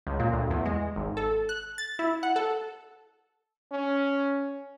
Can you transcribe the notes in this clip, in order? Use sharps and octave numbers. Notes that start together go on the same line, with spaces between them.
C#2
A#2
D2
E2
G#3
G#1
A4
F#6
A6
E4
F#5
A4
C#4